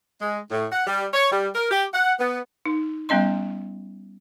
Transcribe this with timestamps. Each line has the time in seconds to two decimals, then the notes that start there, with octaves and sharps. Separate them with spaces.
0.21 G#3
0.51 A2
0.71 F#5
0.87 G3
1.13 C#5
1.32 G3
1.54 A#4
1.71 G4
1.94 F#5
2.20 B3
2.66 D#4
3.09 G3 B3 C#4 D#5 C6